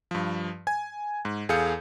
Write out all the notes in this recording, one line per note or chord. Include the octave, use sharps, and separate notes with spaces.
G2 F3
G#5 G#6
G#2
E2 G#4 A4 F5 G6 C#7